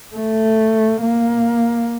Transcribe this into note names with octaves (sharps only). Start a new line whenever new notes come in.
A3
A#3